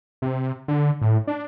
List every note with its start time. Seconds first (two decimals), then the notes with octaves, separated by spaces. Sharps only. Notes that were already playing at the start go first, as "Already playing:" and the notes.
0.22 C3
0.68 D3
1.01 A2
1.27 D4